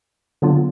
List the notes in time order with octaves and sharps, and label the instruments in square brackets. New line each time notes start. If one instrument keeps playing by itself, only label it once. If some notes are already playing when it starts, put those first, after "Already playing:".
[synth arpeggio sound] D3 F#3 B3 D4 F4